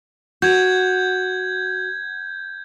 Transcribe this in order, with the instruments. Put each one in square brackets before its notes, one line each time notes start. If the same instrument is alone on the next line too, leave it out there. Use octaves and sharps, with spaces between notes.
[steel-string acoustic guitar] F#4 [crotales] G6 G#6